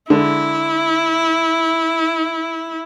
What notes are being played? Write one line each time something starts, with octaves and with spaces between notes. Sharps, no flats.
D3 G#3 E4